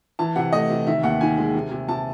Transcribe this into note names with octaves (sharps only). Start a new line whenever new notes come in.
E3 A5
C3 F#5
A3 D#5
C3
D#3 E5
D#2 F#5
D#3 G#5
G#3
C3
C3
C3 A5